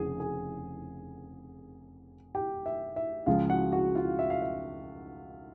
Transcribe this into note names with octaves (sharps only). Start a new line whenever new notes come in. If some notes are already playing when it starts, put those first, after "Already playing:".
Already playing: F1 F2 C#3 G#4 G#5
G#4 G#5
G4 G5
E5
E5
C#2 C#3 F3 G#3 F4 F5
F#4 F#5
F#4 F#5
F4 F5
E5
F5
E5